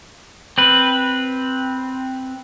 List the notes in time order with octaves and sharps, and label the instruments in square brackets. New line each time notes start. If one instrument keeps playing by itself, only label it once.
[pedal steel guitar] C4 B4